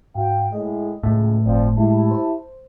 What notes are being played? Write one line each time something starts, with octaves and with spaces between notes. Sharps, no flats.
G#2 F#4 F5 G5
A2 G#3 D#5
C#2 A2
G1 F3 C4 D5
G#3 E4 G4 A5
C5